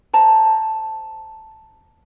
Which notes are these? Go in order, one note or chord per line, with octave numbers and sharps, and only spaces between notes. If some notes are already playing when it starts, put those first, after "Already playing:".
C5 A5 A#5